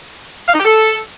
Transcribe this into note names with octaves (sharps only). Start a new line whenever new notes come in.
F5
D#4
G4
A4